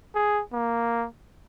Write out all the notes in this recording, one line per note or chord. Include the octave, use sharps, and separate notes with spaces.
G#4
A#3